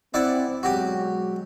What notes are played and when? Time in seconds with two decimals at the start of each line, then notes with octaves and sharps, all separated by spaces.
0.14 C4 E4 D5 F#5
0.63 B2 F#3 G#3 F#4 G4